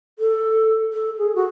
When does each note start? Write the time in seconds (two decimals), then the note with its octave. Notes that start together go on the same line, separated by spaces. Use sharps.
0.19 A4
0.93 A4
1.18 G#4
1.36 F#4